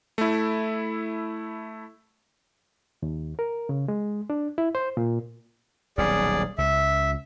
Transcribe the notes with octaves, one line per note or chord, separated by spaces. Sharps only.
A3 E4
D#2
A#4
C#3
G#3
D4
E4
C5
A#2
D#1 B1 G3 G#4 D5
C#2 E5